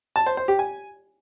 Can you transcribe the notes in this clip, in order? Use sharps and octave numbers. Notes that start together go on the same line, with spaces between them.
A5
C5
C5
G4
G#5